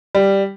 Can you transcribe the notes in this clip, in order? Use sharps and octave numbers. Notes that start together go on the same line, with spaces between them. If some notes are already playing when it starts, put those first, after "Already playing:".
G3